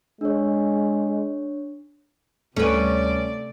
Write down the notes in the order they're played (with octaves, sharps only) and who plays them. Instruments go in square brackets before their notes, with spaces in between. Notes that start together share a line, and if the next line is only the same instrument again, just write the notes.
[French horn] G#3 [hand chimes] D4 C#5
[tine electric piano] D2 G3 [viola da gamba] C3 D5 [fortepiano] A3 [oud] C#4 B4